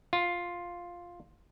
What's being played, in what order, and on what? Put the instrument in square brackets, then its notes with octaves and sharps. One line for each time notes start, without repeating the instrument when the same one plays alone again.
[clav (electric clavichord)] F4